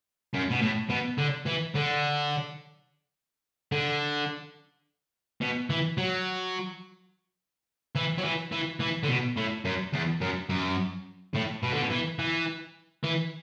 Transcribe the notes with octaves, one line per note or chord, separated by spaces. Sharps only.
F#2
B2
A2
B2
D3
E3
D3
D3
B2
E3
F#3
E3
F#3
E3
E3
E3
D3
B2
A2
F#2
E2
F#2
F#2
A2
B2
D3
B2
E3
E3
E3